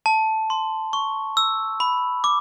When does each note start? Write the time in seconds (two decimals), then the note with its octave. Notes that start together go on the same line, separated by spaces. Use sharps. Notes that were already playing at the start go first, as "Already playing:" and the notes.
0.06 A5
0.50 C6
0.93 C#6
1.37 E6
1.80 B5
2.24 D6